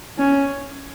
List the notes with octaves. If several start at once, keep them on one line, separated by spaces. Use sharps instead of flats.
C#4